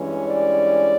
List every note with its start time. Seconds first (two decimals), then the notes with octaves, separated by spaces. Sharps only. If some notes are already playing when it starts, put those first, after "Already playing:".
Already playing: G2 E3 G#3 C#4
0.26 D5